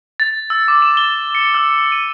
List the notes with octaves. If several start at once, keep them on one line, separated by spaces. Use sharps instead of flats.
A6
E6
D6
E7
G7
C#7
E6
D#7